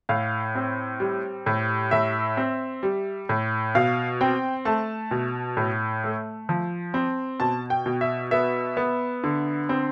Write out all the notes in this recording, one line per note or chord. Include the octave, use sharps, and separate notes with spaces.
A2 F5
C4
G3
A2
A2 E5
C4
G3
A2
B2 F5
C4 G5
A3 A5
B2
A2
A3
F3
C4
B2 A5
G5
B2
E5
B3 E5
B3
D3
C4